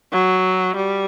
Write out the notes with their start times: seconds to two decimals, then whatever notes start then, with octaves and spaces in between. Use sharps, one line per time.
0.12 F#3
0.75 G3